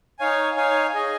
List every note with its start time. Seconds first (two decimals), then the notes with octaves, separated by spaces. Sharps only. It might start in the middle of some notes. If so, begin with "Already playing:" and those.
0.19 D#4 C#5 F5 G#5
0.56 D#4 C#5 F5 G#5
0.94 G#4 D#5 G#5